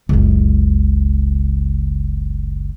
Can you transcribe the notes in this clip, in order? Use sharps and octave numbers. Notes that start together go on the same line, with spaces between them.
F#1 C#2